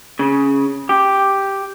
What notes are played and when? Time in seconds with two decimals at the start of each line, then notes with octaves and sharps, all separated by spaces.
0.19 C#3
0.89 G4